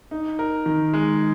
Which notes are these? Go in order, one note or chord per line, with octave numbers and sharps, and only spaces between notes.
D#4
A#4
D#3
G#3